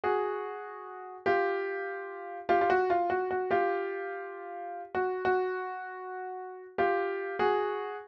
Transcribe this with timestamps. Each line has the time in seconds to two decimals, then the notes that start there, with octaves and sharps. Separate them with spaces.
0.04 F#4 G#4
1.26 F4 G4
2.49 F4 G4
2.61 F4
2.70 F#4
2.90 F4
3.10 F#4
3.31 F#4
3.51 F4 G4
4.95 F#4
5.25 F#4
6.78 F4 G4
7.39 F#4 G#4